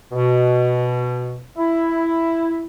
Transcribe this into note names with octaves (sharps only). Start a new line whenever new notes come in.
B2
E4